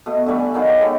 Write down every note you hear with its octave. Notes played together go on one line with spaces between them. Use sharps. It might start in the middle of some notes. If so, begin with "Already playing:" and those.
B2 A3
D3 E3 G3 A3
G#5
D#3 F#3 B3 F5
G4 C#5 G5
G#3 B3 A4